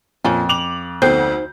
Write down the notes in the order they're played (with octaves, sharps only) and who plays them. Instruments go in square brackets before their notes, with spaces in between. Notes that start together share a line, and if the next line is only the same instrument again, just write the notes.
[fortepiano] F2 [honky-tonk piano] A#2 [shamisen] F3 C#4
[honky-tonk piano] D6 F7 F#7
[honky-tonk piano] D2 A4 G6 [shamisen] B3 C4 G5 [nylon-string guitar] D#4 C5